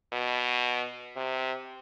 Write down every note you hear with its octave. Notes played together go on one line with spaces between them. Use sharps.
B2
C3